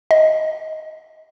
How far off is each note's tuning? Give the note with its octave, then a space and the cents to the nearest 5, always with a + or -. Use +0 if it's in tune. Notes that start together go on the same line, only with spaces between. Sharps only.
D#5 +10